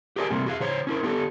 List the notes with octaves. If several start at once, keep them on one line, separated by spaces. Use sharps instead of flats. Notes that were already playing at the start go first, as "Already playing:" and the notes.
G4 G#4 A#4 C#5 D5 G#5
C3 G3 A3 A#3 C4
F#4 G#4 F5
C#3 C5 C#5
C#4 E4 A#4
D3 B3 G4 A4